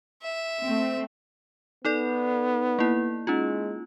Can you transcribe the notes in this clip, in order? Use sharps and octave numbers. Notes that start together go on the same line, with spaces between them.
E5
A3 C4
B3 D#4 A4 D5
A#3 E4
G#3 C#4 D#4 F4